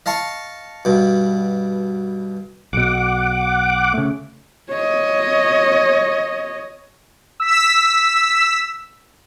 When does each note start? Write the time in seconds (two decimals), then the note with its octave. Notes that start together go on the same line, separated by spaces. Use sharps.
0.06 D#5 F5 A5 C#6
0.85 G2 B2
2.73 B1 B2 F#5 D6
3.94 C#3 A3
4.71 C#5 D#5
7.40 E6 B6